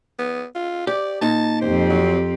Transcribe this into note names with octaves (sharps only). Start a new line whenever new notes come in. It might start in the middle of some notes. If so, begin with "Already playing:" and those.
B3
F4
G4 D5
A#2 D#4 A5
F2 C4 G4 C5
F#3